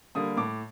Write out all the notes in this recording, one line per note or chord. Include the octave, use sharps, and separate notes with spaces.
D3 G3 A#3 D#6
A2 D6